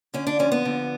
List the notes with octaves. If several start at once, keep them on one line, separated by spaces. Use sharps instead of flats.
D3 C#4
D4
F3 C#4
B3
D3